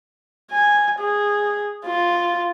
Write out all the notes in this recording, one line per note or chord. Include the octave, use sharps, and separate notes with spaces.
G#5
G#4
F4